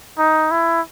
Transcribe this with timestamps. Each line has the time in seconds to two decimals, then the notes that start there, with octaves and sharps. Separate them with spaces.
0.18 D#4
0.51 E4